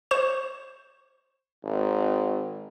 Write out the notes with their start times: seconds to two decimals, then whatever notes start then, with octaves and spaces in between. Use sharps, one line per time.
0.11 C5 C#6 E7
1.64 G#1